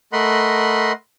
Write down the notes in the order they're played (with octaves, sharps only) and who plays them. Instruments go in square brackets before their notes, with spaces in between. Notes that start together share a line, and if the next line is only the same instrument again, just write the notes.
[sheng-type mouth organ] A3 A#4 D#5 F#5 B5 C6